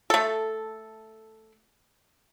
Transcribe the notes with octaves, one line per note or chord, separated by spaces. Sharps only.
A3 A4